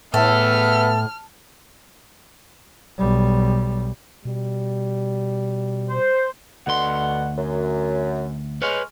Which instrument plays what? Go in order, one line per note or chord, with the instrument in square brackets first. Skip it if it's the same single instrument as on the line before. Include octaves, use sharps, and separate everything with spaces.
[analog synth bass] A2 [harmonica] B3 E5 [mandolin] A4 [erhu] F6
[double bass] B1 G3
[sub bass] B2 [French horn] G3
[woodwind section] C5
[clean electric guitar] D2 C6 [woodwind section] B2 D3 F#5
[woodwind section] F#2
[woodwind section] G#3 C#6 F6 [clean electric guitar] B4 C#5